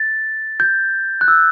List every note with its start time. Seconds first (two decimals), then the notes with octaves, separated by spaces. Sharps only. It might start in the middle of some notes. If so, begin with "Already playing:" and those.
Already playing: A6
0.60 G6
1.21 F#6
1.28 E6